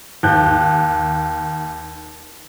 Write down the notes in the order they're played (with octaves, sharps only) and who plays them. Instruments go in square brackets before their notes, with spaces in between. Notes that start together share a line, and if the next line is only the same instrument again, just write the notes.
[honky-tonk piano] D#2 F#6 G6